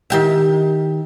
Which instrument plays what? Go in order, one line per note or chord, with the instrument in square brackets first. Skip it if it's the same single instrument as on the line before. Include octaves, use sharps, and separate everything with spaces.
[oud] D#3 G4 E5